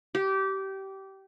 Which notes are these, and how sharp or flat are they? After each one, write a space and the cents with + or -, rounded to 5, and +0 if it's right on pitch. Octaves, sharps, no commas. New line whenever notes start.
G4 -20